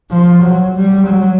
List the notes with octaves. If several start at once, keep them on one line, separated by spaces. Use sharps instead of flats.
F3
F#3
G3
F#3